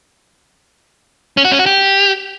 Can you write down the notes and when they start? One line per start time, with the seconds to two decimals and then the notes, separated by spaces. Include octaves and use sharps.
1.37 C#4
1.44 F#4
1.52 C#4
1.59 F#4
1.66 G4